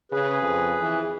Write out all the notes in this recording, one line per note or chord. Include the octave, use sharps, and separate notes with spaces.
C#3 G#4 B4
F2
E3